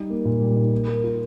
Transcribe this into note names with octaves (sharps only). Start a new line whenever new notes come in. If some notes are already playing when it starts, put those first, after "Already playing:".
Already playing: G3 D#4
A#3
A#2
G3
D#4
A#3
A#4
F4